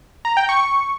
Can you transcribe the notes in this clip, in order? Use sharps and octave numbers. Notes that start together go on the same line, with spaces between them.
A#5
G5
C#6